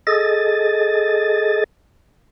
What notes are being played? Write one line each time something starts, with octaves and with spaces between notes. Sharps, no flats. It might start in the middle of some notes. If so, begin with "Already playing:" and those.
G#4 A4 D#5 A6